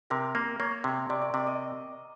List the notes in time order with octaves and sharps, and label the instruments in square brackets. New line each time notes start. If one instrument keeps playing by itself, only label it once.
[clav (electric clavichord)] C3 [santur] A#4
[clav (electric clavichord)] A#3
[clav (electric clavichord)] A#3 [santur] C#5
[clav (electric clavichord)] C3
[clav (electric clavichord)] C3 [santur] D5
[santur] D5
[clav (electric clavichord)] C3 [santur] D5
[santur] D#5